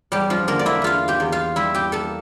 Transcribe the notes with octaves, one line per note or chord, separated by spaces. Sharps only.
E2 G3 G4
F3 F4
D3 A#3 A#4
D5
E4 E5
E2 F4 F5
G4 G5
E2
F4 F5
G3 E4 E5
G4 G5
A#3 A4 A5